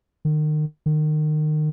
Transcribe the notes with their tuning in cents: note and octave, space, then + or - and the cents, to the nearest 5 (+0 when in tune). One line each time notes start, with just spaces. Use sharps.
D#3 -35
D#3 -30